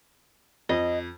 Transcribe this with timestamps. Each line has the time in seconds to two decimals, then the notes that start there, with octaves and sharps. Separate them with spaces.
0.69 F2 D#5